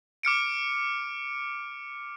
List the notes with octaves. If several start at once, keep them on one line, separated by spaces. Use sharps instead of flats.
D6 F6 C#7 D7